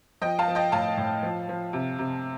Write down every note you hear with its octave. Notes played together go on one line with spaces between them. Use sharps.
F3 D#5 G5
F5 A5
F3
D#5 G5
A2 F5 A5
A2
F3
F3
C3
C3